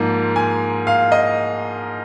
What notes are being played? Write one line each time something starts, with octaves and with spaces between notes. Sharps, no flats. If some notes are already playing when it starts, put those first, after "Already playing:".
Already playing: G#2 F3 A#3
G#5
F5
D#5